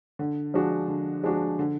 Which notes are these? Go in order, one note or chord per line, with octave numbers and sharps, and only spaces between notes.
D3
F3 G#3 D4 F#4
D3
F3 G#3 D4 F#4
D3